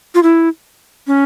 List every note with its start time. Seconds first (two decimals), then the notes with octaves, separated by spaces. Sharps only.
0.15 F4
0.23 E4
1.07 C#4